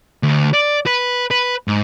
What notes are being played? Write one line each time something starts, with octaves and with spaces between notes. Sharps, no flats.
D2
D5
B4
B4
G#2